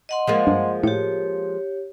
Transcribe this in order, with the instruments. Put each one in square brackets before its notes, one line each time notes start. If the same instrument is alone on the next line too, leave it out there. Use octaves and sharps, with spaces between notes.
[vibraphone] D#5 F#5 C6
[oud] F3 G#3 A#3
[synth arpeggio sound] G2
[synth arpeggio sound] A2 [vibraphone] G4 C#5